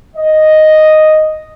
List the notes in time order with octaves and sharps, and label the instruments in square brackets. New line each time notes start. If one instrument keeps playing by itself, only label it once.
[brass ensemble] D#5